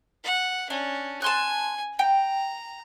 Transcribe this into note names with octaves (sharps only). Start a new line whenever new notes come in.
F#5
C#4 D4
G#5 A5 C6 F#6
G5 A#5